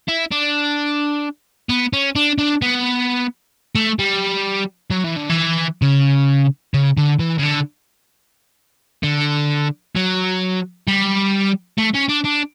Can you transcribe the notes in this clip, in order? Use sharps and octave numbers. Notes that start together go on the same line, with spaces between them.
E4
D4
B3
C#4
D4
D4
B3
A3
G3
F#3
E3
D3
E3
C#3
C#3
D3
E3
C#3
D3
D3
F#3
G3
A3
C#4
D4
D4